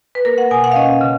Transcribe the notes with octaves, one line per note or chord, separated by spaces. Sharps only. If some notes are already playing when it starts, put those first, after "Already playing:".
B4
A#3 A#4
F#5
B2 G#5
F#5
F5
C#4 D#5
C#3